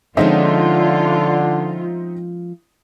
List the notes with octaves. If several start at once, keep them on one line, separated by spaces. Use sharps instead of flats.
D3 F3 G#3 C4 C#4 D#4 F4 E5